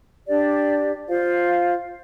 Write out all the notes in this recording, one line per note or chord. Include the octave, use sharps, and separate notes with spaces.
D4 G4 D5
F4 C5 F5